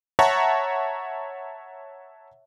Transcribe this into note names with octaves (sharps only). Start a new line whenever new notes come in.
C#5 E5 F#5 A5 A#5 C#6